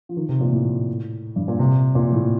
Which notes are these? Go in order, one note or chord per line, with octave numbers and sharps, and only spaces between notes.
F3
D#3
C3
A#2
A2
G2
A#2
C3
A#2
A2